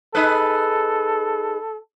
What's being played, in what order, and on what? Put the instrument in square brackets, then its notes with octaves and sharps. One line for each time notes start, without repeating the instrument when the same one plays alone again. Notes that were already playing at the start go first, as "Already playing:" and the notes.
[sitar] D#4 G#4 B4 [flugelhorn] A4